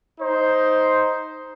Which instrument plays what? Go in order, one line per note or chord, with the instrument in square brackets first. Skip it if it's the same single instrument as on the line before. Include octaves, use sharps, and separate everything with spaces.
[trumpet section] D#4 C5